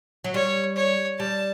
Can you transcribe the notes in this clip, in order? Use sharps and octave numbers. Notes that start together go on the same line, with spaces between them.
F#3
G3 C#5
C#5
G3 A5